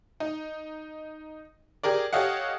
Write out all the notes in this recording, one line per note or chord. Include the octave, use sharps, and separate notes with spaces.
D#4
G4 G#4 A#4 D5
G4 A4 C#5 D#5 F5 F#5